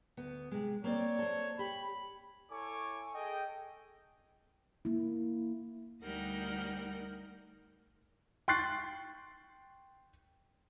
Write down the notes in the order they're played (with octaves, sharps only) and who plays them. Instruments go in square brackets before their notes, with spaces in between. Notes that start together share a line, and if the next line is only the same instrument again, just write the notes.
[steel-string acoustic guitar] D2 B3
C3 G#3
[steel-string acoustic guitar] A#3 C4 D5 [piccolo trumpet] C#5
[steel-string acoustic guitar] A4 C5
[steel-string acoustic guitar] G4 [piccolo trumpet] B5
[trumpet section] E4 A4 C#5 G#5 C#6 D6
G#4 A4 D#5 G5
[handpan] A#3 E4
[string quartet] D2 G3 D#4 A#4 F#5 G6
[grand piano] G5 C6 C#6 F#6 A6 C7